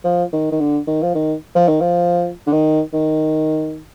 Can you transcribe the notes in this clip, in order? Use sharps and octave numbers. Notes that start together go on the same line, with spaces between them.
F3
D#3
D#3
D3
D#3
F3
D#3
F3
D#3
F3
D3
D#3
D#3